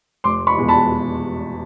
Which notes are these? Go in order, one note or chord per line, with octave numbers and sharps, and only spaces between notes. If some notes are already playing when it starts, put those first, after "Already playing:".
F1 C6 D6
B5 C#6
E2 B2 G#3
A5 B5